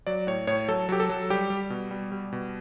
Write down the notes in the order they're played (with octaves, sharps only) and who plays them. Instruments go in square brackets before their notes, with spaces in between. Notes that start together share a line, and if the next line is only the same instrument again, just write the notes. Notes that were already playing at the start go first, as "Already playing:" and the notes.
[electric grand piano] F#3 D5
A2 C#5
A2 C#5
F#3 A4
F#3 G4
A4
F#3
G3 G4
G3
B2
G3
G3
B2